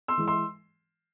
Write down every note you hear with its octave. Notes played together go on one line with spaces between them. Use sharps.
C6 E6
E3 G#3
C6 E6